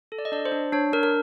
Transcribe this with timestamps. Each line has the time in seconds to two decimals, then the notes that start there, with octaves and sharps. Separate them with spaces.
0.12 A4
0.18 D5
0.25 D#5
0.32 D4 D5
0.45 C5
0.52 D4
0.72 D4 C#5
0.93 D4 A#4
1.03 A#4